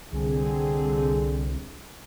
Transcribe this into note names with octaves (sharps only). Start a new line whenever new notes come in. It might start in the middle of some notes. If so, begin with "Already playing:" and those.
C2 D3 C4 G#4